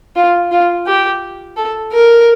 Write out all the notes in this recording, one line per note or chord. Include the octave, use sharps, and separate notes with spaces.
F4
F4
G4
A4
A#4